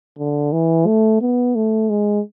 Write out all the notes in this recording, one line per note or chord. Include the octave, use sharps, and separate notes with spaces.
D3
E3
A3
B3
A3
G#3